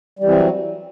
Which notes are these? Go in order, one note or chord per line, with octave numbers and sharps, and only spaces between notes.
E3 F#3 G3 C4